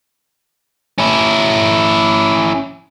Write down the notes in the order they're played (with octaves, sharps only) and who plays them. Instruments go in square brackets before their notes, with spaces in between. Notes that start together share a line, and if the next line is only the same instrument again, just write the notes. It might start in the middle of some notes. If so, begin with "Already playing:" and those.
[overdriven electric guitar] C#4 E4